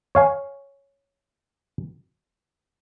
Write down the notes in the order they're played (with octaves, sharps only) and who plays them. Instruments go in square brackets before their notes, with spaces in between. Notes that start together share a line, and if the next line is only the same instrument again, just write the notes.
[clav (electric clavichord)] C#5 F5 G#5